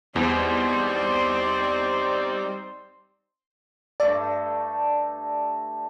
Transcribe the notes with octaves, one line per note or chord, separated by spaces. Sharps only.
E2 G3 C4 D#4 C5 D5
G2 A3 A4 D5